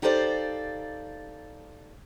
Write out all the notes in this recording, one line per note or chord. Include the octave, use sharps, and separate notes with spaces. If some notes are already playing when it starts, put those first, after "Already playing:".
D#4 G4 A4 C5 D5 F5